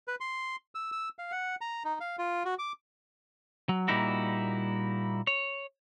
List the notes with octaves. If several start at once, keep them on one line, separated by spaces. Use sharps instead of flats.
B4
C6
E6
E6
F5
F#5
A#5
D#4
F5
F4
F#4
D6
F#3
A#2 G3 A#3 D#4 E4 F#4
C#5